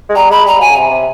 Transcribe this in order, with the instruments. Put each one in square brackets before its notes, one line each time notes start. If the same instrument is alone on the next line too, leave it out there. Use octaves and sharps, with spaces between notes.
[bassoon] G#3
[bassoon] G3 [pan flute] A#5
[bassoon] G#3 [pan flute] B5
[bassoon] G3 [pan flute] A#5
[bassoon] F#3 [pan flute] G#5
[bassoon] C#3
C3
C3